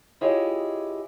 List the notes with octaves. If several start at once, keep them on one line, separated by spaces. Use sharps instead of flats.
E4 F4 G4 G#4 C#5 D#5